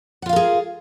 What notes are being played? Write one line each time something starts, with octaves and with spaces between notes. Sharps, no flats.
F4 G#4 A#4 F5 F#5